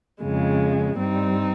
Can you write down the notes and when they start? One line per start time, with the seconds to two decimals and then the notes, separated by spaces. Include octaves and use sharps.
0.23 F2 C#3 G#3
0.97 G2 G3 C4 D#4